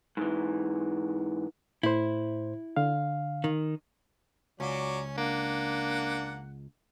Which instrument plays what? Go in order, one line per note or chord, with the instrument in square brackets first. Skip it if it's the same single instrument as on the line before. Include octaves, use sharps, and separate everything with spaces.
[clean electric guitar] G#2 E3
[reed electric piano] A2 C5 [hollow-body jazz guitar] E4
[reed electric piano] D3 F5
[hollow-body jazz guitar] D#3
[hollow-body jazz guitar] C#2 [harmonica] F#3 D5 [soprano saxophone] C#4
[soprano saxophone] A#3 [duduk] D4 [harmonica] F#5